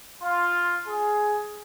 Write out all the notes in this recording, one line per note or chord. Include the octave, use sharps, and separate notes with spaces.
F4
G#4